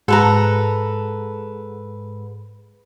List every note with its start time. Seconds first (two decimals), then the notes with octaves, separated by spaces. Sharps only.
0.08 G#2 A4 B4 A#5